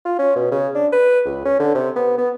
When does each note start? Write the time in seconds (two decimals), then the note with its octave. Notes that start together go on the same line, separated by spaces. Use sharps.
0.05 F4
0.19 C#4
0.36 B2
0.51 C#3
0.75 D4
0.92 B4
1.25 C#2
1.45 C#4
1.59 D3
1.75 C3
1.95 B3
2.18 B3